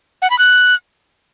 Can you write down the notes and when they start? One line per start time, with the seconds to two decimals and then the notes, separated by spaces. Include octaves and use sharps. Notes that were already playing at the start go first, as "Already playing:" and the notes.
0.22 F#5
0.30 B5
0.39 F#6